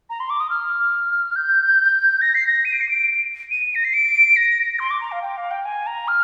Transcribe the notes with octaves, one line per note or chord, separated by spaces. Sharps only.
A#5
C6
D6
D#6
F6
G6
A#6
C7
A#6
D#7
D7
C7
D7
D#7
A#6
C7
D7
A#6
C6
D6
A#5
F5
G5
F5
G5
G#5
A#5
F6